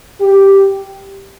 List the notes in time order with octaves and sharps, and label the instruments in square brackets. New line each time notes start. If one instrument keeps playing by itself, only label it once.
[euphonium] G4